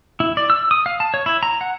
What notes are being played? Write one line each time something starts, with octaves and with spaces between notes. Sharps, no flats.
E4
D5
E6
D#6
F5
A5
C#5
E4
A#5
F#5